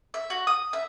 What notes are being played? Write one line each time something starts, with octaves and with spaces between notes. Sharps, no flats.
E5
F#4
D#6
E5